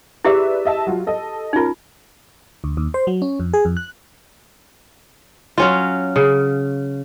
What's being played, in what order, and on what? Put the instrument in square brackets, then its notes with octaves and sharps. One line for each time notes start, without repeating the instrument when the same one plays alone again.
[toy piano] E4 G4 G#4 [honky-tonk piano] B4 D5 E5
[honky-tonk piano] D#5 E5 A5
F#3 F4
A4 D#5
[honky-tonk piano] C#4 A#4 [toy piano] D#4 F4
[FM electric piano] D2
D#2
C5
F#3
C#4
F2
G#4
F2
F#6
[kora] F#3 C#4 F4
C#3